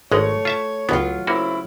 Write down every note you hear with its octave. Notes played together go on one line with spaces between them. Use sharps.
G#1 G#3 A3 C#5
F4 E5 A5
C#2 F#3 B3 F4
C#3 A#3 C4 E4 F#4